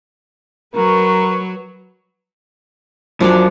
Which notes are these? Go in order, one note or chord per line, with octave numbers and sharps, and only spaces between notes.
F#3 A#4 B4 C#6
F#2 F3 F#3 D4 D5